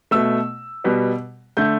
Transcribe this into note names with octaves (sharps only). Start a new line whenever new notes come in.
B2 A3 E6
B2 G3 B3
D3 A3 G6